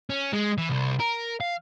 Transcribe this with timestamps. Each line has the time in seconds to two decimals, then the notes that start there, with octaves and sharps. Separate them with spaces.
0.10 C#4
0.33 G#3
0.58 E3
0.69 C2
1.00 A#4
1.41 F5